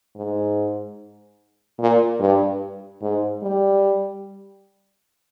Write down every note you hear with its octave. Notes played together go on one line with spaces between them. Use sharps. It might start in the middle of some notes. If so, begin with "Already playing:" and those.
G#2
A#2
G2
G#2
G3